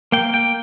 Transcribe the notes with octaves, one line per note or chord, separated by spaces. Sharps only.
A#3 G5
G5